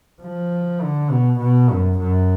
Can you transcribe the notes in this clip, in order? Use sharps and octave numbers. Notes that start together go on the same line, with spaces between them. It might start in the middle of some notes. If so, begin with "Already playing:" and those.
F3
D3
B2
B2
F#2
F#2